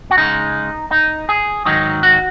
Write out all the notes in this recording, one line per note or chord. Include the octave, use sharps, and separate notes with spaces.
F#4
C#3 G#3 D#4
D#4
G#4
G#2 D#3 F#3 D#4
F#4